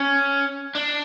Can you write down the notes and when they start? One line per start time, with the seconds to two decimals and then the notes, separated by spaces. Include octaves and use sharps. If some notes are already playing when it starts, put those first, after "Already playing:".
Already playing: C#4
0.75 D4